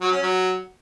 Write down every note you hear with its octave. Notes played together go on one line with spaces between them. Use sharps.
F#3
C#4
F#3